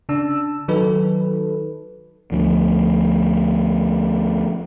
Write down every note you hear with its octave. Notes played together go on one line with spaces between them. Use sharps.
C#3 D4 A5 E6
D#3 F#3 D#4 A4 B4
D2 F3